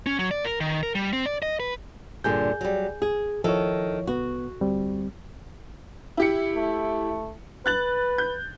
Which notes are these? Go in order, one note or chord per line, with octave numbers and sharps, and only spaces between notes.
C#4
F#3
D5
A#4
D#3
A#4
G3
C4
D5
D#5
B4
G2 A#2 D3 G#4 G#5 G6
F#3 G3
G#4
D#3 F3 E4 A4 C#5
C2 B3 F#4
D2 G3 C4
E4 G4 C#7
A3
B4 F#6 A6 F#7
G6